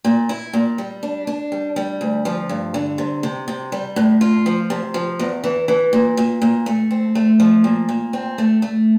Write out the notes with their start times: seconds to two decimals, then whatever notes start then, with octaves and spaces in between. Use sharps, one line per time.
0.04 A#2
0.29 E4
0.53 A#2
0.78 G3
1.03 D4
1.27 D4
1.52 G3
1.76 G3
2.01 D2
2.25 F3
2.49 G2
2.74 D3
2.98 C3
3.23 C3
3.48 C3
3.72 G3
3.96 A2
4.21 F4
4.46 F3
4.70 C3
4.94 F3
5.19 E2
5.44 E3
5.68 E3
5.93 A#2
6.17 A#2
6.42 A#2
6.66 A3
6.91 C4
7.15 A3
7.40 F3
7.64 A#2
7.89 A#2
8.13 C4
8.38 A3
8.62 A3